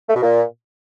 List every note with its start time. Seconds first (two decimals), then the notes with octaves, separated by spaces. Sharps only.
0.09 A3
0.15 B2
0.22 A#2